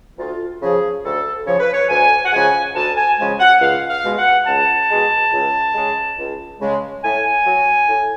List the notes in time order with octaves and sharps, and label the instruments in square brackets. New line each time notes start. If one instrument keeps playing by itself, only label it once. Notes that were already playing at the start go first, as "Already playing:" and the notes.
[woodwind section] D2 F4
C#3 F3 G#4
D2 A4
C#3 F3 C#5
B4
C#5
D2 G#5
F#5
C#3 F3 G#3 G#5
D2 A5
G#5
C#3 F3 G#3 G#5
F#5
C#2 F5
F5
B2 G#3
F#5
C#2 A5
B2 G#3
C#2
C#3 G#3
C#2
C#3 G#3
A2 G#5
F#3
A2